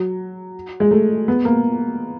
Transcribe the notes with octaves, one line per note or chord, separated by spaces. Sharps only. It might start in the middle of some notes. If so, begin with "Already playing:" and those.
Already playing: F#3
G#3
A3
B3
A#3